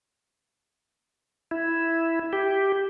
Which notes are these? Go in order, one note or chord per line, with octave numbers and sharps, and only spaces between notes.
E4
G4